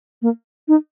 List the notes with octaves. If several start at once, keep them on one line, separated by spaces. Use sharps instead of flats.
A#3
D#4